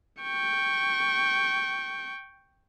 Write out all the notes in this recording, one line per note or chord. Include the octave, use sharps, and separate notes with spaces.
G5 C#6